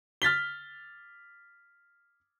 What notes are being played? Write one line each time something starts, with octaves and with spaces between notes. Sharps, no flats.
F6 A6 B6 G7